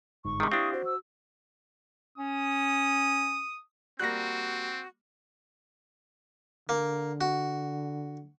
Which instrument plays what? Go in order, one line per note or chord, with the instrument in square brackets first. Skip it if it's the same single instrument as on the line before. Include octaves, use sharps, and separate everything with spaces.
[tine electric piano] G1 G#2 [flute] C#6
[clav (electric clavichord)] C3 D#3 [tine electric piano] G#3
[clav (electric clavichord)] C4 D4 [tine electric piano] E4 G4 F5 [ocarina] D#6
[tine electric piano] F#4 [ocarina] C5
[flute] E6
[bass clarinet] C#4 [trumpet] D#6
[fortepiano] G3 A#3 [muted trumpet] C4 [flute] F#4 [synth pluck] F#6 A#6
[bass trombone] D3 [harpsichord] A#3
[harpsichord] F#4